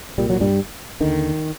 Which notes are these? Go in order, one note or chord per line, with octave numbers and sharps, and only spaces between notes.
C2 A#2 G3
F#3
G2 G3
D#2 D3 D#3